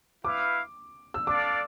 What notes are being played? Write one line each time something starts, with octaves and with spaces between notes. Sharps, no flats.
E4 B4 F5 D6
E6
D4 A4 D5 F5 D6